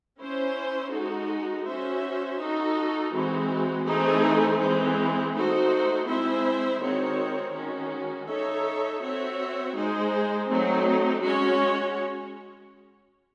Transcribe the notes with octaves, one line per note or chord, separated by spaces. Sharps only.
C#4 E4 C5
G#3 D#4 F#4 A4
C#4 F#4 C5 E5
D#4 F#4 A4
E3 G#3 C4 F#4
E3 A3 C4 D#4 G#4
E3 G#3 C4
A3 D#4 F#4 C5
G#3 C4 E4 C5 E5
D#3 G#3 C4 F#4 C#5
D#3 G#3 C#4 F#4
D#4 A4 C#5 E5
C4 F#4 C#5 E5
G#3 D#4 G#4 C5
F#3 A3 C4 D#4
G#3 C#4 F#4 C#5